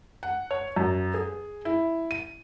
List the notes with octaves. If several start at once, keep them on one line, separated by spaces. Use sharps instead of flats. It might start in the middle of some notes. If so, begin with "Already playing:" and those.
F#5
C#5
F#2
G#4
E4
D#7